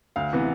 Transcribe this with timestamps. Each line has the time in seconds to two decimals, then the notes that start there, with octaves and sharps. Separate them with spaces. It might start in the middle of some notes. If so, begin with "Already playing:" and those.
0.16 D2 F5
0.33 C3 E3 B3